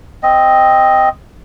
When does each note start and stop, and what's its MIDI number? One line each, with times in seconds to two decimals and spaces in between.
0.23 1.09 60
0.23 1.09 75